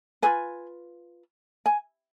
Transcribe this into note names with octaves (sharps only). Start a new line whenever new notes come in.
F4 G#4 B4 G#5
G#5